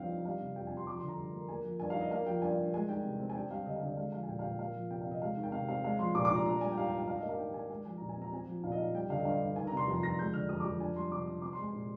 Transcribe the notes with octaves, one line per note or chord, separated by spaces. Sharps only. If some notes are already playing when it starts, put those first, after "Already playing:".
Already playing: G2 F3 C4 F5 G5
D#4
G3 F5
C3
F2 G5
C4 G#5
C6
F3 D6
C6
D3
A#5
G2
A#3
A#3 G#5
F3
G2 G#5
F5
D#4
D#5
A#3 F5
F3 G5
G2 G#5
G2
G#3 G#5
D#3 G5
C3
C4
G#5
D4 G5
G3 F5
D3 D#5
F5
D3 D#5
G#3 F5
F3 F5
G#5
A#2 G5
F5
A#2 G5
A#3 F5
F3
C3 G5
F5
C3
D#5
G#3 F5
D#3
G5
C3 F5
C4 F5
G#3 F5
F3 C6
A#2 D6
D6
A#2 A#5
D4 A#5
G3 G#5
G5
G#2 F5
G5
G#2
G5
D4 F5
D#5
A#3
F5
D#3 G5
D#3 G#5
G#3 G#5
F3 G#5
A#2 A#5
G#5
C4 A#5
C4 G#5
F3
A#2 F5
D#5
D#4 F5
G3 G5
D3 F5
D#5
G2 F5
G2
D#3 G#5
A#5
C3
C6
F2
F2 A#6
G#3 G6
D3 F6
F2 D#6
D6
F2
D4 G#5
G3 C6
C3 D6
C3 D#6
C4 D6
C6
G#3 G#5
A#2